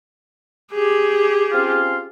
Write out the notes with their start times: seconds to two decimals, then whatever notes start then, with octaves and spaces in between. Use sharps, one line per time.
0.73 G4 G#4
1.52 C4 C#4 F4